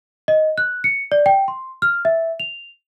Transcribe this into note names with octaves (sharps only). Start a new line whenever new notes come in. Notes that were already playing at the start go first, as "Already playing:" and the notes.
D#5
F#6
C#7
D5
G5
C6
F6
E5
F7